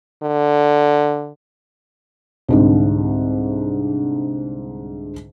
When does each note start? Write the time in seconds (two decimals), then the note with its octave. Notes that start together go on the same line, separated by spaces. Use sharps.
0.23 D3
2.48 C2 G#2 D3